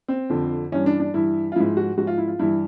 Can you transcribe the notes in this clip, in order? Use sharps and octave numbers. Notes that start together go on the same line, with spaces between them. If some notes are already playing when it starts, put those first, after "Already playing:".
C4
F2 D3 F3
G2 E3 C#4
D4
D4
G2 E3 E4
F4
G#2 F3 E4
F#4
G#2 F3 F#4
F4
E4
F4
G2 E3 E4